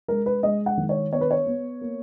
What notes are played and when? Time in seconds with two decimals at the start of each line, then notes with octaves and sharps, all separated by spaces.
0.08 G#3 A#4
0.26 B4
0.43 G#3 D#5
0.66 F#5
0.77 D#3
0.89 C#5
1.12 B3 C#5
1.21 B4
1.31 C#5
1.46 B3
1.81 A#3